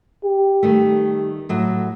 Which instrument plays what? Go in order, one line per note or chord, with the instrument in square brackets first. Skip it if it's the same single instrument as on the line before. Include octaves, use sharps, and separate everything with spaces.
[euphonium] G4
[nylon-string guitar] D#3 G3 A3
A2 F#3 E5